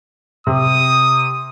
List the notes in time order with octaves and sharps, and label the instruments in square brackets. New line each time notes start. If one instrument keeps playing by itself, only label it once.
[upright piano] C3 [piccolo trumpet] D#6